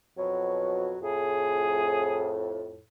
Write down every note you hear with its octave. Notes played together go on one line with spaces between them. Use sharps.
F2 B2 F#3
F2 A2 G#4